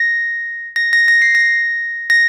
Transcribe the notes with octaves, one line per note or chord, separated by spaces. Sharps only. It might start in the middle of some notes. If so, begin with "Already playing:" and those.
Already playing: A#6
A#6
A#6
A#6
C7
A#6
A#6